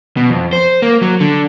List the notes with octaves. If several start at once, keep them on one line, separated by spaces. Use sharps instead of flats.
B2
F2
C5
A#3
F#3
D3